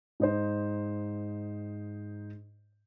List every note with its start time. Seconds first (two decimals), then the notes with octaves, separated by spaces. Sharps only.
0.20 G#2 D#4 C5